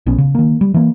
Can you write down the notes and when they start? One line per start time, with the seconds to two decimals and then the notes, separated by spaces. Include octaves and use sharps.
0.06 A#1 B3 C#4
0.18 C#3
0.35 D#3 A#3
0.61 G3
0.74 E3 A#3